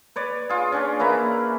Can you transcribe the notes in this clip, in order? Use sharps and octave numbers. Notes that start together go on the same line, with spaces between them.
B4 C#5 D5
F4 G#4
C#4 D4 D5
A#3 E4 B4 A#5